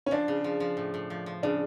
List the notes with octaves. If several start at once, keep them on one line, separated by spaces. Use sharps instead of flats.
C#4
F3 D4
C#3
F3
F3
A2
A2
F3
F3
C#3 D4